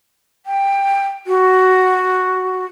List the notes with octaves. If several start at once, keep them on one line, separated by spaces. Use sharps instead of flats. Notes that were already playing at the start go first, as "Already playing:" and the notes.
G5
F#4